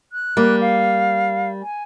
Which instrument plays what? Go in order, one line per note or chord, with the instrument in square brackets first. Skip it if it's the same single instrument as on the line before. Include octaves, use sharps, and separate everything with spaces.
[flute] F#6
[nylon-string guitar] G3 A#3
[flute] F5
G#5